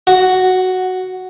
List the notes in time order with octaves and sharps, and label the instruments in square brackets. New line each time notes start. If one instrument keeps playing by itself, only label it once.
[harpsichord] F#4